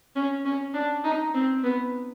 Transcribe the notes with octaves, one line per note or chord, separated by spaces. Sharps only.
C#4
C#4
D4
D#4
C4
B3